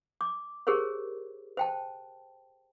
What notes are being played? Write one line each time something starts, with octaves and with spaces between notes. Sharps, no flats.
D6
G4 G#4 A#4 C5 C#5
C5 G5 A5